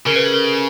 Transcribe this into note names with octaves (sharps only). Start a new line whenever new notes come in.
C#3 A#4
B4
A4
A#4